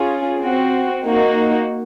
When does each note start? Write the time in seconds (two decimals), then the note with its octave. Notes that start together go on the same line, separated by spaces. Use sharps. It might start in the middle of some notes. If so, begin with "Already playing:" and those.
Already playing: C#4 F4 G#4
0.40 C4 F#4
1.04 A#3 D#4 F#4